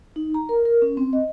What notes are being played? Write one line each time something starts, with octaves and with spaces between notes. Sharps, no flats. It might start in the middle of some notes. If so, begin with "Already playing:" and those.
D#4
A#5
A#4
A#4
C#4
C4
D#5